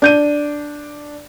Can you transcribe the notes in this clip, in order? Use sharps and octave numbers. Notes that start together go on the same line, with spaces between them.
D4 G6 D#7